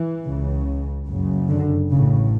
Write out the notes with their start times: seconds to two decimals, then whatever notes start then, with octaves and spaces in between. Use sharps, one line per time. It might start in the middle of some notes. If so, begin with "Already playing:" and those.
Already playing: E3
0.25 C#2 C#3
1.08 F#1 F#2 C#3
1.50 D3
1.91 A1 A2 C#3